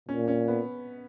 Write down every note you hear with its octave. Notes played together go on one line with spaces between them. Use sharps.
A#2 C#4
C#4
B3